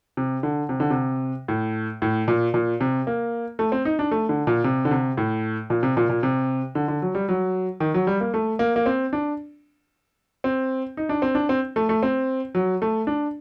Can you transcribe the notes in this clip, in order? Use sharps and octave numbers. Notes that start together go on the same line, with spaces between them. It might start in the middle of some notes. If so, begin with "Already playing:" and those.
C3
D3
C3
D3
C3
A2
A2
A#2
A#2
C3
A#3
A3
C4
D#4
D4
A3
D3
A#2
C3
D3
C3
A2
A#2
C3
A#2
A#2
C3
D3
D3
F#3
G3
F#3
D#3
F#3
G3
A#3
A3
A#3
A#3
C4
D4
C4
D#4
D4
C4
D4
C4
A3
A3
C4
F#3
A3
D4